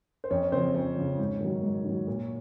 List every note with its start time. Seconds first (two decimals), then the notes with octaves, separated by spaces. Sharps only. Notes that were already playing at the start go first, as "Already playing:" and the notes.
0.24 C5
0.30 F2 C#4 C#5
0.52 C#3 F3 C4 C5
0.74 F2 C#4 C#5
0.96 C#3 F3
1.18 G#2
1.41 D#3 F#3
1.63 G#2
1.85 D#3 F#3
2.07 A#2